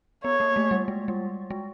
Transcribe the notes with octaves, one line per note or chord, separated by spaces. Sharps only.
B3 C#5
A#3
A3
G3
G#3
G3
G#3